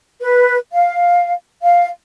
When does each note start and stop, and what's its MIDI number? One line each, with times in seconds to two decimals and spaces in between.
0.22 0.57 71
0.72 1.33 77
1.63 1.87 77